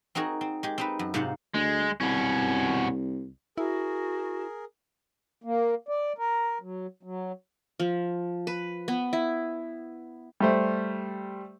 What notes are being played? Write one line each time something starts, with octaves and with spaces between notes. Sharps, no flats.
C4 D#4 F#4 G#4 A#4
C4
G#3 G4
C4 D#4 B4
F#2
G#2 C3 D#4 F4 C5 F#5
D2 G#3
C2 B2 C#4
E4 F#4 G#4 A#4
A#3
D5
A#4
F#3
F#3
F3
B4
B3
E4
G3 A3 C5